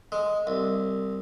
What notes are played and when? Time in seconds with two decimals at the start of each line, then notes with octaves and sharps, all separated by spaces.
0.12 G#3
0.47 C2